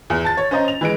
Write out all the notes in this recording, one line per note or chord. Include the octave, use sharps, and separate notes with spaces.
E2
A5 A6
C#5
C#4 C5 D#5 A#5
F7
E3 G#3 D7